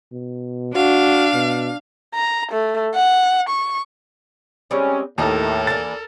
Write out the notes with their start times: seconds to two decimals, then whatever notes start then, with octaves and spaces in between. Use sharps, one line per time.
0.12 B2
0.75 D4 F#4 F5
1.34 B2
2.15 A#5
2.52 A3
2.95 F#5
3.49 C#6
4.71 G3 G#3 C4 C#4
5.18 D#2 A2 A4 A#4 D#5 A5 A#5
5.67 E3 A#3 D4 A6